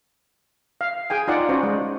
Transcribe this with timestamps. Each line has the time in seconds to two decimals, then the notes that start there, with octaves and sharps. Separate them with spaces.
0.81 F5
1.10 G#4 G5 G#5
1.28 D#4 F4 D5 F#5
1.49 C#4 F#4 C5
1.63 G#3